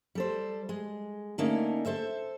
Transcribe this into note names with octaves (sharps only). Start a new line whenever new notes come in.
G3 A4 C5
G#3
D3 A3 A#3 C#4 D#4
A4 C5 E5